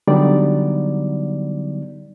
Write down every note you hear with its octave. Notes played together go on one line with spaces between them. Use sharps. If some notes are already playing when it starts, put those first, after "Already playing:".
D3 F#3 G3 B3 D#4 D5